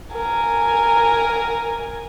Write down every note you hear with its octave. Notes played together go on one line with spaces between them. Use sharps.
A#4 G#5